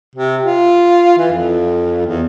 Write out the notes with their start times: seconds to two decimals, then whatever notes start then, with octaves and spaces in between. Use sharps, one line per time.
0.15 C3
0.44 F4
1.18 E3
1.32 F2
2.07 E2